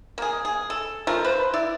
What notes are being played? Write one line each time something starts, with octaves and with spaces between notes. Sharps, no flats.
A#3 G#4
G#4
A4
F3 A3 F4 A#4
B4 C5
E4 D5